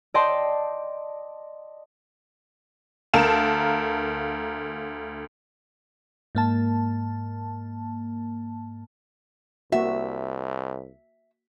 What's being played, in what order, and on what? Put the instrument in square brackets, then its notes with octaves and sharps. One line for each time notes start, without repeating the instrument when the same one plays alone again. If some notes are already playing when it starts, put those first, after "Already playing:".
[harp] D5 D#5 G5 A5 C6
[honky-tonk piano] D2 A#4 F5 A5 E7
[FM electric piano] G#2 A#3 A5
[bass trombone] C2 [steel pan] A#3 F#4 [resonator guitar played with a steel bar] E5